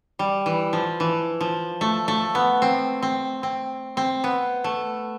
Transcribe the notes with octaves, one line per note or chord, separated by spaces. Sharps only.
G3
E3
F3
E3
F3
A3
A3
B3
C4
C4
C4
C4
B3
A3